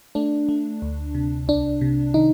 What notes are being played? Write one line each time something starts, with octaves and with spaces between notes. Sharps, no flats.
A3 D4
A3
D2
C3
C2 D4
C3
D#3 D#4